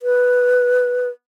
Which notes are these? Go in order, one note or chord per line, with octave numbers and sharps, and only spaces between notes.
B4